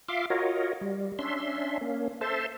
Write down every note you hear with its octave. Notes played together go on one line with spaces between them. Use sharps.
F4 E5 F5 C6 D6
F4 F#4 A#4 C#5 D#5
G3
C#4 D4 E5 C6
A#3 C#4
A4 C5 E5 A5 C6